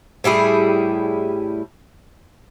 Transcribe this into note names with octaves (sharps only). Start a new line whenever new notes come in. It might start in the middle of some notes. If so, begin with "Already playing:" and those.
A2 G3 E4 G#4